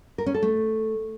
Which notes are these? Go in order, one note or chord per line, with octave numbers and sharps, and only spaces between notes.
A#4
C#4
A4
A3